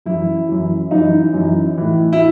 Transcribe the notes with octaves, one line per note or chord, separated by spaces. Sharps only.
F#2 E3 E4
F#2 E3
F#2 E3 D#4
F#2 E3
A2 E3
E4